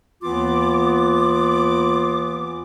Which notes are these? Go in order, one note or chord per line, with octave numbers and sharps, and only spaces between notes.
D#2 E3 B3 F4 D6